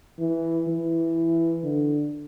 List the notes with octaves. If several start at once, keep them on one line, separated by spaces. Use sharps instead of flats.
E3
E3
D3